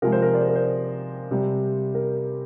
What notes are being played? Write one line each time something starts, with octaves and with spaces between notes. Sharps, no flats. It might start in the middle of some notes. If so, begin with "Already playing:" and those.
C3 F3 G#3 A#4
C5
A#4
D5
C5
A#4
C5
C3 G3
A#4